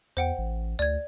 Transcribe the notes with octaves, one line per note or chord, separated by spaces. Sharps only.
E2 C5 F#5 G5
A1
D2 D5 G#6